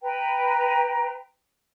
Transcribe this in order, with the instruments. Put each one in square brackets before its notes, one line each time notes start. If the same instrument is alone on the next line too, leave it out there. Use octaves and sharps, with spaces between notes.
[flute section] B4 G5 A#5